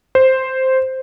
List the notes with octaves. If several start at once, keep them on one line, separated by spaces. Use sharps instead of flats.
C5